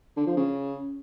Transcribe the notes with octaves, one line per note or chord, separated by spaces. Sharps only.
D3
F3
C#3